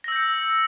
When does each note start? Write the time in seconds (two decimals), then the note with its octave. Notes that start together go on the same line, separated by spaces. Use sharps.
0.04 A#6
0.08 E6
0.12 G6
0.16 C#7